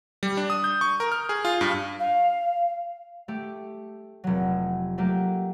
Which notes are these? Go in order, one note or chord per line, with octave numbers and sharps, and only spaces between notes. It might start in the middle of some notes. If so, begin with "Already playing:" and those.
G3
D4
D#6
G6
C#6
A#4
F6
G#4
F4
G2
F5
A3 G4
F1 F#3
F#3 A3 A#3 G4